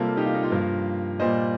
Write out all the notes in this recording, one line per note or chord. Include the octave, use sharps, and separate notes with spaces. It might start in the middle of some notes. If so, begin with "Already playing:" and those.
Already playing: C3 G3 A#3 F4 A4
D#4 G4
F4
D#4
F4
G2 F3 A#3
A#2 G3 A#3 C5 D#5